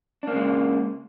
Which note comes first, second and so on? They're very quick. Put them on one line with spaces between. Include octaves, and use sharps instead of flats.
D4 A#3 C#3 G#3